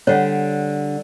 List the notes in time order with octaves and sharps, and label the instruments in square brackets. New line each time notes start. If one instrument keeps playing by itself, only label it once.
[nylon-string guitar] D3 G3 [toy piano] C#5 F#5